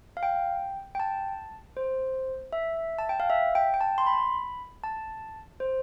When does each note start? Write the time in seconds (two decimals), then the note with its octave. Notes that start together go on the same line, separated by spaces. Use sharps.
0.17 F5
0.23 G5
0.95 G5
1.00 A5
1.77 C5
2.53 E5
2.99 A5
3.09 G5
3.20 F5
3.30 E5
3.55 G5
3.74 G5
3.81 A5
3.98 C6
4.07 B5
4.84 A5
5.60 C5